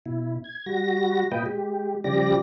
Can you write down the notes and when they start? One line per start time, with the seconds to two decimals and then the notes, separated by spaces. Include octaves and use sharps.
0.06 B2 E4
0.44 G#6
0.66 G3 F#4 A#6
1.32 A#2 F4 B4 D#5 G5
1.46 G#3 G4
2.04 C#3 F3 G3 G4 D5 A#6